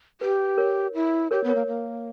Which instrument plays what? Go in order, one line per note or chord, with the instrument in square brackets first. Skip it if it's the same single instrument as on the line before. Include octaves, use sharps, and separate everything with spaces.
[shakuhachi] G4 [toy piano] B4
[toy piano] A#4 C#5
[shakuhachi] E4
[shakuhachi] G4 [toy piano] A#4 C#5
[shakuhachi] B3
[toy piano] A#4 C#5
[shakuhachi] A#3
A#3